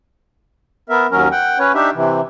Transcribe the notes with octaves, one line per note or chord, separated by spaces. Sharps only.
B3 A#4 E5
D#2 F#3 C#4 A#4
F#5 G5
C#4 B4 C#5
D4 D#4 G4 E5
C3 E3